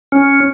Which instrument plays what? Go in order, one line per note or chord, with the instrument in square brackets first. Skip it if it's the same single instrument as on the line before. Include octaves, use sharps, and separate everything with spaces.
[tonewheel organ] C#4